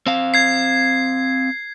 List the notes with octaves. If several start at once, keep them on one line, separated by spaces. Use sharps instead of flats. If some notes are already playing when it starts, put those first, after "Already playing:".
C4 F5
G#6 C7